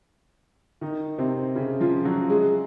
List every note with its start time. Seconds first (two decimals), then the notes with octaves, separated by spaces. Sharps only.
0.81 D#3 D#4
1.18 C3 C4
1.55 C#3 C#4
1.80 F3 F4
2.04 F#3 F#4
2.30 G#3 G#4